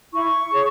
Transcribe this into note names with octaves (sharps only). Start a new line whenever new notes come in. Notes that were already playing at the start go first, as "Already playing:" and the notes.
E4 C#6
G#4 C#5